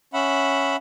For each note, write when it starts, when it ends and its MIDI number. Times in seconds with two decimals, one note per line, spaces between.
0.14 0.76 61
0.14 0.76 76
0.14 0.76 78
0.14 0.76 83